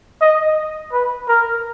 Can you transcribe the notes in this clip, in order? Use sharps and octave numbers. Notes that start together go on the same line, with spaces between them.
D#5
B4
A#4